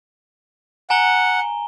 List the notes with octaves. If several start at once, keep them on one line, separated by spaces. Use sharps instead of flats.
F#5 G#5 A#5 G7